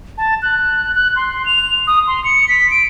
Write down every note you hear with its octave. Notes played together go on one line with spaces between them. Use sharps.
A5
F#6
F#6
C6
F7
D#6
C6
C#7
B6
D7